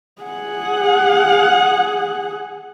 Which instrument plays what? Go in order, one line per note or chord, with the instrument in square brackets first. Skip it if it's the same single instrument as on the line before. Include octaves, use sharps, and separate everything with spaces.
[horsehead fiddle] G#4 F#5